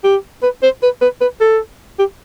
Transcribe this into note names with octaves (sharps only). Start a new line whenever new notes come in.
G4
B4
C5
B4
B4
B4
A4
G4